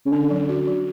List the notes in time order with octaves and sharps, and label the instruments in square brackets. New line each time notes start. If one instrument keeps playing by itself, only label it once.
[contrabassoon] C#3
[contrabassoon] D3 [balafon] C#4
[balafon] F#3
F#4
F#3